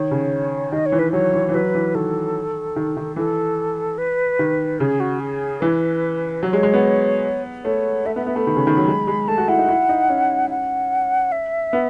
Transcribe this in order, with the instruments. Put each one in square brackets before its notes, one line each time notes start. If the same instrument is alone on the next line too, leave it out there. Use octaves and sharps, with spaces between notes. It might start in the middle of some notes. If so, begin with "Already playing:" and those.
Already playing: [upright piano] D#3 [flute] C#5
[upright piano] C#3
[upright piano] D#3 [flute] D#5
[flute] C#5
[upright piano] E3
[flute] B4
[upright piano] F#3 [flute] C#5
[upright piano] E3
E3
[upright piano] F#3 [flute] B4
[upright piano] E3
[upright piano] D#3 [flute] A4
[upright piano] D#3
D#3
[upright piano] E3 [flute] A4
[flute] B4
[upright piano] D#3
[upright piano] C#3 [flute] G#4
[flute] F#4
G#4
[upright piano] E3 [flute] B4
[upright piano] F#3 [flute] C#5
[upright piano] G#3
G#3
B3
[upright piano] A3 [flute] C#5
[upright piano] A3 [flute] E5
[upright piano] B3 [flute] E5
[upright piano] B3 [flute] E5
[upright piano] A3 [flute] B5
[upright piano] D#3
C#3
D#3
F#3
G#3
G#3
[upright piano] A3 [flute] A5
[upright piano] F#4
[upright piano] E4 [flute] F#5
[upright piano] D#4
E4
D#4
C#4
[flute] F#5
E5
[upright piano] B3